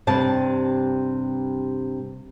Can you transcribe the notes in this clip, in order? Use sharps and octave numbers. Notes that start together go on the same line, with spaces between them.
G2 C3 A5